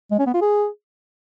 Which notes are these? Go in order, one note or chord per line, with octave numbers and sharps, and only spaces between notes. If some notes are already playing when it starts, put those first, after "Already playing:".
G#3
C#4
B3
F4
G#4